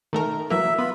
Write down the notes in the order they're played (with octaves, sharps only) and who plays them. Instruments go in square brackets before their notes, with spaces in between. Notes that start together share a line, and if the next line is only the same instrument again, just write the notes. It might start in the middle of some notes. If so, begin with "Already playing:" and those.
[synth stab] D#3 A3 A#4
[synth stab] E3 F#3 A#3 [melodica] E5
[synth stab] B3 [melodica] F4 B5